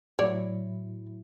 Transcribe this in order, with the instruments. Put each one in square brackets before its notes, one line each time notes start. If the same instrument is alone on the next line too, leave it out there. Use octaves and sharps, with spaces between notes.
[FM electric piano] A2 F#3 E4 [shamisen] C#5 D5